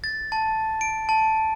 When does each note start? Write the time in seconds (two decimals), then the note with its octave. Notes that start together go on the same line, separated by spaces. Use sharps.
0.04 A6
0.32 A5
0.81 D7
1.09 A5